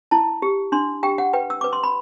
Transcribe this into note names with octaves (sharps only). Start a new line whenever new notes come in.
E4 A5
G4
D4 C6
G4 G5
F#5
B4 G5
E6
B4 D6
C6
B5